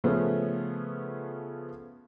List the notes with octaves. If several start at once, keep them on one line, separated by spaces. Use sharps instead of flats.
C#3 F3 A3 B3 C#4